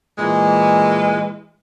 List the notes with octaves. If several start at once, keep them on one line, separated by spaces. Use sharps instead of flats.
A#2 E3 G#3